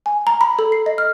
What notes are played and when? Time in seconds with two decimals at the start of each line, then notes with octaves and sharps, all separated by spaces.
0.06 G#5
0.27 A#5
0.41 B5
0.59 A4
0.72 C7
0.86 D#5
0.98 F6